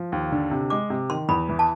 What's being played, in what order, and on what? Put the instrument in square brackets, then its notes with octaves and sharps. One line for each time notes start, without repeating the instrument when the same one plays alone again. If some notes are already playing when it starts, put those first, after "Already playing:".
Already playing: [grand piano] F3
D#2
D3
C3
[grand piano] G#3 [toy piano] D6
[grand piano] C3
[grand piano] D#3 [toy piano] C6
[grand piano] E2 [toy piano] B5
[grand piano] E3
[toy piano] A5